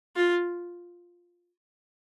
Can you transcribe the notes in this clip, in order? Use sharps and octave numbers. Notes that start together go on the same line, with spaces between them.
F4